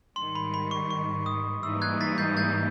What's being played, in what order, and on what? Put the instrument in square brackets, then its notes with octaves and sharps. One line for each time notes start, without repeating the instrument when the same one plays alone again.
[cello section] G#2 D#3 G3 [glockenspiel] C6
[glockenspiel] B5
B5
C#6
C#6
D#6
[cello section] G#2 E3 G3 A#3 D#4 [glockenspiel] E6
[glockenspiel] F#6 G#6
A6 B6
G6 A6
G6 A6